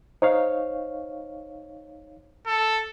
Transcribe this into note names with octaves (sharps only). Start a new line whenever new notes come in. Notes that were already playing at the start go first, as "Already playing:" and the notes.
D#4 C5 C#5 F5
A4